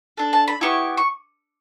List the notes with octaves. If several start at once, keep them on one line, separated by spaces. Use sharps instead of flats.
D4 A4
A5
B5
B3 E4 G4 C#6
C#6